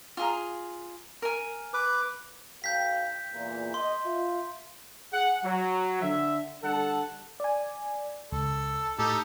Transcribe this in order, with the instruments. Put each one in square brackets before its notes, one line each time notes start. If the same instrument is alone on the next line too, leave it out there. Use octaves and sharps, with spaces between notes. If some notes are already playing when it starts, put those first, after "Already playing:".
[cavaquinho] F4 G#4 A#5
A#4 G#5
[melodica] B4 D6
[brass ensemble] B1 F5 G5 [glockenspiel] G6 B6
[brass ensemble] E2 A#2
[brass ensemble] D#5 [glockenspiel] C6
[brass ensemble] F4 E5
[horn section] G#4 F#5
F#3
D3 E5
D3 G3 A4 F#5 A5
[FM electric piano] D5 G#5
[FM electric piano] C#2 [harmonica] A4
[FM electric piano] A2 [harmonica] D#4 G4 A4